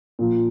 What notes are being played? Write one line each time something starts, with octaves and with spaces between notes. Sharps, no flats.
A#2 F3